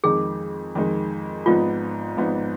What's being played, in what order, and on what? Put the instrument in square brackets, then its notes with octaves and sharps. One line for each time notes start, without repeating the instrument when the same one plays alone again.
[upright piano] F2 D#3 G#3 D#4 [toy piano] G#4
[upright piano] F2 D#3 G#3 D#4
[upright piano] G#1 G#2 F3 B3 D#4 [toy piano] F4
[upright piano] G#1 G#2 F3 B3 D#4